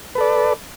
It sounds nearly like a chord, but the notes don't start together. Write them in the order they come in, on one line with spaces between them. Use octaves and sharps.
B4 A4 D5